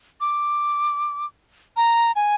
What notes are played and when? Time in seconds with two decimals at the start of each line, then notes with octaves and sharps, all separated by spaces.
0.21 D6
1.77 A#5
2.16 G#5